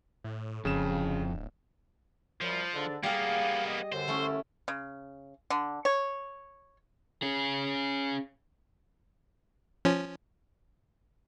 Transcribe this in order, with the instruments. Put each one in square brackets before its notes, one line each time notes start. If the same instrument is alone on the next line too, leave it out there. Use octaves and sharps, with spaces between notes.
[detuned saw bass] A2
[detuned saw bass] D1 [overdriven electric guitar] F2 [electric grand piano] C#3 E7
[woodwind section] F#2 G3 [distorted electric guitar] F3
[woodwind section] G#2 D3 D4
[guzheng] G3 G#4 [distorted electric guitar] A#3 B3 [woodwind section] F5
[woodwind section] D#5
[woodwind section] F#2 D3 [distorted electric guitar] C5
[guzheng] A3 C#4 E4
[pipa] C#3
D3
C#5
[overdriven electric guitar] C#4 G#4
[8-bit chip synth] F3 C#4